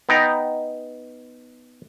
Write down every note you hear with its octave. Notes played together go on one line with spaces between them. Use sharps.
B3 D#4 G5 A#5